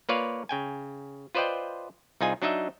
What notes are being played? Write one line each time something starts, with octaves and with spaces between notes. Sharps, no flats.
A#3 F4 B4 C#5 D5 F5
C#3 G5 G#5
F4 B4 C5 D5 D#5 G5
C2 D#4 F4 G#4 G#5
F#3 D4 D#4 D#5 E5